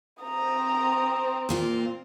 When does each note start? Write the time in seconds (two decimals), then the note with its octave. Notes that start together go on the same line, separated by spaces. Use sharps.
0.22 C4 A#5 D#6
1.49 A#2 A#3 F4